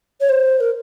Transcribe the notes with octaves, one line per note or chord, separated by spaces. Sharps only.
C#5
C5
A#4